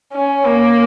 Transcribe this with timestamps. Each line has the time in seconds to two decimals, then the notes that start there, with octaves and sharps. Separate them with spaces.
0.13 C#4
0.45 A#3